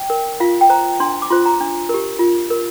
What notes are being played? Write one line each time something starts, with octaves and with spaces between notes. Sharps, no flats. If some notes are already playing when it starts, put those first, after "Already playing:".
Already playing: G5
A#4
F4 F5
G5
C5 A#5
D4 C6
D6
F4 C5 C6
A#5
D4
G4 A#4
F4
A#4